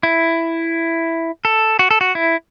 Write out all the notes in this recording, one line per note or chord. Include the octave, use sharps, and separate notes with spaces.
E4
A4
F#4
A4
F#4
E4